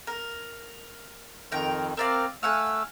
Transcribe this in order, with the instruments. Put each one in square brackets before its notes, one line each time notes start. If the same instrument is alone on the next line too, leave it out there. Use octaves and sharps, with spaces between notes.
[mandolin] A#4
[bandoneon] F2 D#3 [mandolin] A#4 G5
[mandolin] C4 D5 F5 [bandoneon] A#4
[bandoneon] A3 E6 [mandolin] F5 F#5 G#5